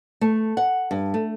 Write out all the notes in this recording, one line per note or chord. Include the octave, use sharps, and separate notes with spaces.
A3
F#5
G2
A3